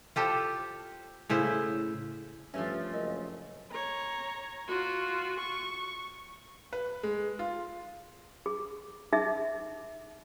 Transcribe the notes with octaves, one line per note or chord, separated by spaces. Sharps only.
F4 G4 A4 C5
A2 C#3 E4 C5
G2 F3 A3 C#4 E5
F#1 A#4 D#5
C#5 A#5
F4 F#4
C#6
B4
G#3
F4
G#4
D#4 G#4 E5